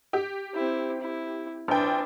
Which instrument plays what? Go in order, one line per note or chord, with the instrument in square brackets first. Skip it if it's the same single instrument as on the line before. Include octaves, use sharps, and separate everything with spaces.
[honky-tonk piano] G4
[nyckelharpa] C4 E4
E4
[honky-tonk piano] A#1 G5 [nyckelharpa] D4 B4